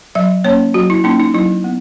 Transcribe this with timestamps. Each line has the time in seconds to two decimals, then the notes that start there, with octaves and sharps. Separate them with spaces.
0.15 F#3 E5
0.44 A#3 C#4 C#5
0.74 F#3 F#4
0.90 E4
1.04 A#3 C#4 D#4
1.20 D#4
1.34 F#3 E4
1.64 B3